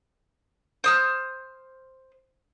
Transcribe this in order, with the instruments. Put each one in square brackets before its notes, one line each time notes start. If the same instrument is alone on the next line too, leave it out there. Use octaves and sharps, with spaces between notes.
[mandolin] C5 D#6 F6